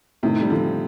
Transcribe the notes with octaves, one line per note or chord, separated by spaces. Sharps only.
A2 C3 D#3 A3 D#4
G3
D3 F3